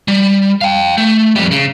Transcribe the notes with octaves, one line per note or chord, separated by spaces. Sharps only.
G3
F5 G5
A3
F2 G3
C#3